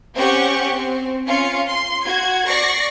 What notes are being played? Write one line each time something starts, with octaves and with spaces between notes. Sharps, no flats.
C4 C#4 G4 F#5 C#6
C4
C#4 F4 F5 C#7
C6
F#4 G#6
D5 C#6 A#6 C7